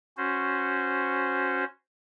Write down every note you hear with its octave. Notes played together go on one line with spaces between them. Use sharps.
C#4 F#4 C5